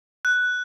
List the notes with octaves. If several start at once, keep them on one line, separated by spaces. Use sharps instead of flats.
F#6